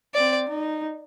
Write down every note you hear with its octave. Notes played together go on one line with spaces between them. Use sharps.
C4 D5
D#4